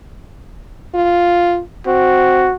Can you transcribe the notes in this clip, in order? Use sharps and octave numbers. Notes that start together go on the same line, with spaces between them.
F4
C4 F#4